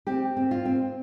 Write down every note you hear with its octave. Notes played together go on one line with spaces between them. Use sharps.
C4 G4
C4
F4
C4